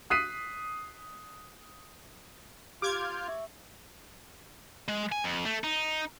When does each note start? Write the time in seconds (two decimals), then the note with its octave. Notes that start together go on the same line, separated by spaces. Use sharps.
0.10 D#6 F#6 B6 C7 D#7
2.82 F4 G4 D6 F6 G6 G#6
3.28 E5 C#6
4.88 G#3
5.12 G#5
5.24 F2
5.45 A3
5.64 D#4